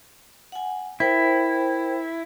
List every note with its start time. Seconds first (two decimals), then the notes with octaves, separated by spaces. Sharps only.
0.52 F#5 G#5
1.00 E4 A#4 C5 G5